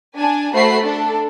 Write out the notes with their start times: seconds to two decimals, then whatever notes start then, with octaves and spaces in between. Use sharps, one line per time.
0.16 D4 G#5
0.54 A3 F#4 C5 B5 C7
0.83 D4 A4